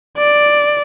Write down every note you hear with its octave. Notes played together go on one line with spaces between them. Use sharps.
D5